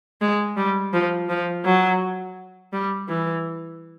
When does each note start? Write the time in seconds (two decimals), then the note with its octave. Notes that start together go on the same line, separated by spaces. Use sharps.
0.21 G#3
0.57 G3
0.93 F3
1.29 F3
1.65 F#3
2.73 G3
3.09 E3